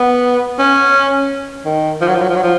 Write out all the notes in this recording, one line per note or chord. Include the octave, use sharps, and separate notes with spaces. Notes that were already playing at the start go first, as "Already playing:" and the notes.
Already playing: B3
C#4
D#3
F3
F#3
F3
F#3
F3
F#3
F3